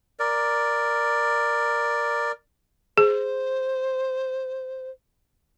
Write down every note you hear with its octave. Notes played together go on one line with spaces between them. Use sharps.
A#4 D5
G#4 C5